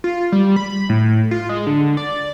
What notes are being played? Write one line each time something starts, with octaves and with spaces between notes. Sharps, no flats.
F4
G3
B5
A2
F4
G#3
D3
D5